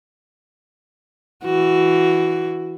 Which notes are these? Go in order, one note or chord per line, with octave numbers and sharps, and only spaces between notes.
E3 F#4